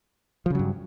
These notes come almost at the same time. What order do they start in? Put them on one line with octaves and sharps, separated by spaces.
F3 C#3 F#3 G2